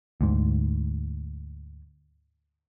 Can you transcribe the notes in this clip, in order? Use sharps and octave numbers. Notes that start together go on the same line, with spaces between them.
D2 G#2